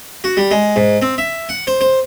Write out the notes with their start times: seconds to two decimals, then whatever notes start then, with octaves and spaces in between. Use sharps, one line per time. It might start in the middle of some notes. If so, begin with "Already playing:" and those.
0.24 F#4
0.37 G3
0.51 G#3
0.76 G#2
1.02 C4
1.18 E5
1.49 F#5
1.67 C5
1.81 C5